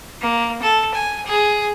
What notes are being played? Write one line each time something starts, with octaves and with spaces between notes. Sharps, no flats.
A#3
A4
G#5
G#4